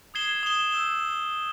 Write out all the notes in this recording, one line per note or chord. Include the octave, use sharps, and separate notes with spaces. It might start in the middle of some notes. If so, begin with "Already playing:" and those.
D#6 G#6 C7 E7 G7
D#6 G#6 C7 E7 G7
E6 G6 C7 E7 G7